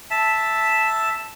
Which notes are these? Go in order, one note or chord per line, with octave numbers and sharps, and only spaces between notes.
E5 A5